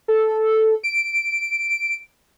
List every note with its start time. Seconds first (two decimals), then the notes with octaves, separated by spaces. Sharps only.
0.08 A4
0.83 D7